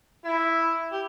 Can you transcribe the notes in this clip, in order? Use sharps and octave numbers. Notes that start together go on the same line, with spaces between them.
E4
G4